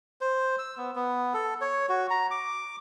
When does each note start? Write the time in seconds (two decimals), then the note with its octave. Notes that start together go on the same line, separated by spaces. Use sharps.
0.21 C5
0.59 E6
0.77 B3
0.96 B3
1.34 A4
1.61 C#5
1.89 F#4
2.10 A#5
2.31 D6